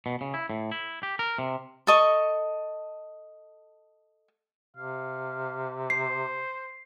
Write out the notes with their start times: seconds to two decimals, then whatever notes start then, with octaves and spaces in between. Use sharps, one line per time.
0.06 B2
0.21 C#3
0.34 E4
0.50 A2
0.72 E4
1.03 G4
1.19 A#4
1.38 C3
1.87 A4 D#5 C#6
4.77 C3 F5
5.90 C5 C7